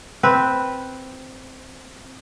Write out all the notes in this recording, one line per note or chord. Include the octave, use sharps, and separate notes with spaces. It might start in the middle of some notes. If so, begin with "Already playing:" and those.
C4 B4